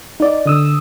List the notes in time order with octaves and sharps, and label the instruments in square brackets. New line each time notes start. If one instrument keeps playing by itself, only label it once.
[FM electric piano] D#4 D5
D3 D#6 E6